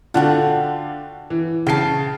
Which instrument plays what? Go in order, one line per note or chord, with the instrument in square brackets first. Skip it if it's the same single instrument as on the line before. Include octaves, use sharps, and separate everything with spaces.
[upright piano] D3 D4 F4 [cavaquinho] F#4 F#5 G5
[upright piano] E3
[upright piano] C#3 C7 [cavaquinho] G5 A5